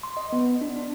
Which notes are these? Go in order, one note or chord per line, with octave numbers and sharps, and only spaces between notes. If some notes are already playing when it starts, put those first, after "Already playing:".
C6
D#5
B3
D4
D4